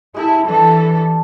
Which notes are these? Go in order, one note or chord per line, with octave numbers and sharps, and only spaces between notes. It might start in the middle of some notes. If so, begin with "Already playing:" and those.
G#3 E4 G4 A4
E3 D4 A4 A5